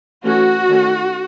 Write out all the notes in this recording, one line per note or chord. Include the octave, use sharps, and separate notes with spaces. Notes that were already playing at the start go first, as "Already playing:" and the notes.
E3 A3 C#4 F#4
D#3 A3 C#4